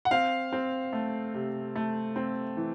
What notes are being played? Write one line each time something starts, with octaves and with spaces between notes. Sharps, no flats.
F#5
C4 F5
C4
A3
C3
A3
C4
E3